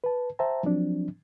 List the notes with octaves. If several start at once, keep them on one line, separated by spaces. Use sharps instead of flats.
B4 A5
C5 E5 G5 A5 A#5
F3 F#3 C4 D4